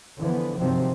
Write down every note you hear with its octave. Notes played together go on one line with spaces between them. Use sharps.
D3 E3 F3 B3
G1 C3 D#3 F3 F#3 C4